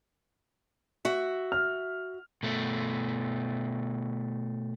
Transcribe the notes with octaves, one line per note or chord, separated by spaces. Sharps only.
F#4 E5
F6
B2 A3